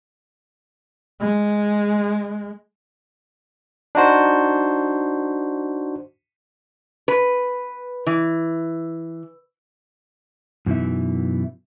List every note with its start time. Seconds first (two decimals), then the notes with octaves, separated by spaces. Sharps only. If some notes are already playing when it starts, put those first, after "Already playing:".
1.20 G#3
3.95 D4 D#4 F#4 C5
7.08 B4
8.07 E3
10.66 F#2 B2 E3 D#4 E5